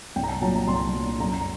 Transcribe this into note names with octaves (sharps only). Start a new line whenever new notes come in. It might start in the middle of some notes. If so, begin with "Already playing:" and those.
C2 G5
A#5
A5
A#2 F#3 A5
A#5
C2 C6
A#2 F#3
F#2 A#5